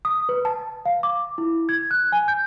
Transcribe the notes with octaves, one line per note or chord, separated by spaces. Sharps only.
D#6
B4
A5
F5
D6
E4
G#6
F#6
G#5
G6